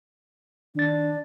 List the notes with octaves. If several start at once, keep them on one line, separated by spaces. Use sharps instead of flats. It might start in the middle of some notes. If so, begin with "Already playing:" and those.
D#3 D4 A6